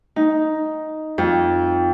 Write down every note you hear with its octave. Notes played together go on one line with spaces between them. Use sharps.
D#4
F2